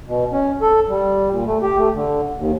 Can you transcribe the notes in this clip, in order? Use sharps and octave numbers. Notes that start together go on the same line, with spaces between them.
B2
C#4
A4
G3
A#2
A3
G4
A3
D3
D#2